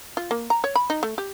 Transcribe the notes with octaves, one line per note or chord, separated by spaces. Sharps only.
F4
A#3
A#5
C#5
B5
D#4
A3
G4